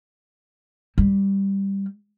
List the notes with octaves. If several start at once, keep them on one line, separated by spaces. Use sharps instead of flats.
G3